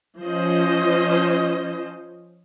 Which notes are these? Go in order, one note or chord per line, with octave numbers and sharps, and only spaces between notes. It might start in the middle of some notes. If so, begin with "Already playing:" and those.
F3 C#4 C5 D#5